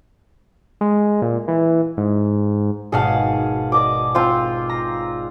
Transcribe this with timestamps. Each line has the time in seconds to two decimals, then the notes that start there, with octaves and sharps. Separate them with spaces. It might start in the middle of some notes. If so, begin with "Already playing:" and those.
0.81 G#3
1.22 A#2
1.48 E3
1.97 G#2
2.92 G#1 B2 G#4 F5 F#5 A5
3.72 D5 D#5 D6
4.15 C4 F4 C6
4.69 A#5